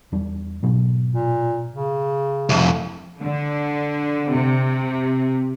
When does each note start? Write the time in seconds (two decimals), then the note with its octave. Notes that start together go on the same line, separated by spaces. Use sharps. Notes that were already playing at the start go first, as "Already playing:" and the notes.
0.12 E2 G3 D4
0.63 G#2 B2 F#3
1.14 A#2
1.73 C#3
2.49 C2 F2
3.21 D3
4.30 C3